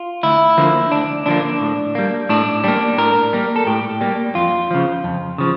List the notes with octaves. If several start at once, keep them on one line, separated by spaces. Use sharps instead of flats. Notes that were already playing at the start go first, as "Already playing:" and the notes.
Already playing: F4
D2 E4
D3 F3 A#3
D2 D4
D3 F3 A#3 D4
A2
G3 A#3
A2 D4
G3 A#3 D4
A2 A#4
G3 A#3
A4
A2 G4
G3 A#3
F2 F4
C#3 F3
F2
C#3 F3